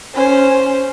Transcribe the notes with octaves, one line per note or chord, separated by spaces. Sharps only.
C#4 C5